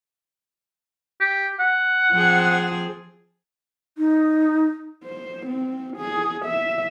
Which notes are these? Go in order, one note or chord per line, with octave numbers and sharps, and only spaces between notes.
G4
F#5
F3 C4 G#4
D#4
C5
C4
G#4
E5